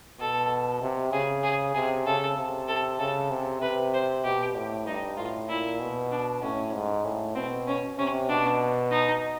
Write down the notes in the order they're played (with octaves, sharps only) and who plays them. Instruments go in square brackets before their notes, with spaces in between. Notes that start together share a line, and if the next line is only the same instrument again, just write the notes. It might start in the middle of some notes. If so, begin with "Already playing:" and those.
[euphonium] B2 [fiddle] A4
[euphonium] C3
[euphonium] C#3 [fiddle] G#4
[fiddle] G#4
[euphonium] C3 [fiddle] G#4
[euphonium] C#3 [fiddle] A4
[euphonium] C3
[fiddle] A4
[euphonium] C#3 [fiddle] A4
[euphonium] C3
[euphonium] C3 [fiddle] B4
[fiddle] C5
[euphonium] B2 [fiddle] G4
[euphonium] A2
[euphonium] G2 [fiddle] D#4
[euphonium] A2 [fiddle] F4
[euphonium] A#2 [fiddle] E4
[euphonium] B2
[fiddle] D4
[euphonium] A2 [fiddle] C#4
[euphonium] G#2
A2
[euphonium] B2 [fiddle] C4
[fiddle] C#4
[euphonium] C3 [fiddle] C#4
[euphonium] B2 [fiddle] D4
[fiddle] D#4